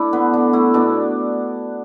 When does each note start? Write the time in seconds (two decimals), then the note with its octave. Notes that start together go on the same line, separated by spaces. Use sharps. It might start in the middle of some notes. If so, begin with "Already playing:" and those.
Already playing: A3 D4 E4
0.13 D3 B3
0.33 D3 D4
0.53 A3 E4
0.74 B2 D4